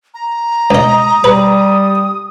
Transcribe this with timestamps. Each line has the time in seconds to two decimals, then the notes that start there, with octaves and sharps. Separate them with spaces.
0.14 A#5
0.71 C#2 D#5 D#6
1.24 G3 B4